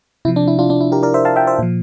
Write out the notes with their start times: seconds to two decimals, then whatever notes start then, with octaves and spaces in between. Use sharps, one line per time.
0.25 C3 E4
0.28 F3
0.36 D4
0.48 E4
0.59 D4 F4
0.70 D4
0.81 E4
0.92 G4 A#4
1.03 A#4 D5
1.14 C5 E5
1.25 F5 A5
1.36 E5 G5
1.47 C5 E5
1.59 A#2 F3